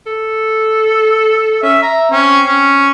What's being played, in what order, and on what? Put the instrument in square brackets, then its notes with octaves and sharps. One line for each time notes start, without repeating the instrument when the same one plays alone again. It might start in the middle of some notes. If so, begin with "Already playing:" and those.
[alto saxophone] A4
[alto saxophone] C#4 [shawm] E5
[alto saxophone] E5 [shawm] A#5
[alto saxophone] C4 [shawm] C#4
[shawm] C#4